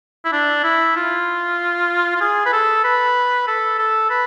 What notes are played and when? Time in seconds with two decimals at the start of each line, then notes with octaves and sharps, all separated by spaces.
0.25 E4
0.32 D4
0.64 E4
0.96 F4
2.16 F4
2.21 G#4
2.46 B4
2.52 A4
2.84 B4
3.47 A4
3.79 A4
4.10 B4